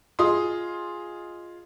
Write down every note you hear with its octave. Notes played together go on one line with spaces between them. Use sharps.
F4 G#4 D#5 C6 D#6